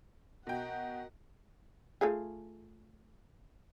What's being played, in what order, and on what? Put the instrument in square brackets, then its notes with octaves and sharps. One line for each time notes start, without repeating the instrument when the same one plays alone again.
[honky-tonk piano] B2 G5 [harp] F#4 A#4 [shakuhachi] D#5 [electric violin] F#5
[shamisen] A3 F4 G#4